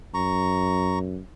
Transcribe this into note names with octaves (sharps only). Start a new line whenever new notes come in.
F#2 A#5 C#6